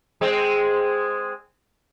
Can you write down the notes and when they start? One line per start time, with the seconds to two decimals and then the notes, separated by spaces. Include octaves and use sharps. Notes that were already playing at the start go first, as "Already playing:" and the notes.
0.21 G#3 C4